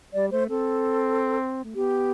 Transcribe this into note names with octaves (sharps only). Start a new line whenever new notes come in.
G3 D5
A3 C5
C4 A4
A3
B3 G4